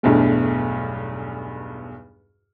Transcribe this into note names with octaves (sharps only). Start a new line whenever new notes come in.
B1 E2 G2 A3